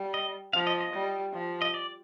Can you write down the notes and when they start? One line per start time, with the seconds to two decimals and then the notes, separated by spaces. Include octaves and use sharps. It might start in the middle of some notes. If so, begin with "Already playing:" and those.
Already playing: G3
0.14 D#5
0.53 F3 F5
0.67 D#5
0.81 D#5
0.93 G3
1.33 F3
1.62 D#5
1.74 D5